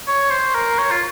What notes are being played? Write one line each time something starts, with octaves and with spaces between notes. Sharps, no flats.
C#5
C5
A#4
C#5
F4